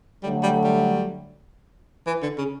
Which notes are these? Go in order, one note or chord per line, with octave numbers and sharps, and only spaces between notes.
D3 F#3 G3 A3
G3
G3
E3
D3
C#3